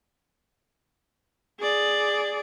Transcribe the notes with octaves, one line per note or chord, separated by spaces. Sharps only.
G#4 D5